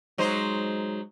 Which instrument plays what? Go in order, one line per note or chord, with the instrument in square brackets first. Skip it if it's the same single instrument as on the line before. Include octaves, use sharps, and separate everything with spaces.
[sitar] F#3 D#4 C5 [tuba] G#3